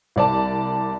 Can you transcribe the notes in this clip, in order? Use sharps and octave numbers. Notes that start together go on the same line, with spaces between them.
C2 D5 A5